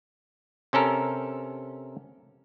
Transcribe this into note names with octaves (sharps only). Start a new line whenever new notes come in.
C3 C#4 A4 A#4